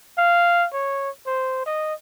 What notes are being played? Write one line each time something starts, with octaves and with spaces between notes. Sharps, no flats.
F5
C#5
C5
D#5